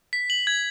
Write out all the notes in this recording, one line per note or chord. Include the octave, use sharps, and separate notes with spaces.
B6
F#7
G#6